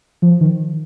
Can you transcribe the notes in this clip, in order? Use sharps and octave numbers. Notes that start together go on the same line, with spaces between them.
F3
D#3